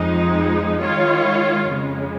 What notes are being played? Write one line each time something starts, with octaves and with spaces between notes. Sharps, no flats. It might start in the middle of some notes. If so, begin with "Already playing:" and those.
Already playing: F2 F3 G#3 D#4
D#3 G#3 F4 C#5
F2 C#3 G#3